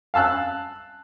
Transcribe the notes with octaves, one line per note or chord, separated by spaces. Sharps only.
F5 A5 E6 F#6